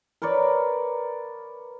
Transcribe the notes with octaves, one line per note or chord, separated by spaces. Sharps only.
A#4 B4 C#5 D5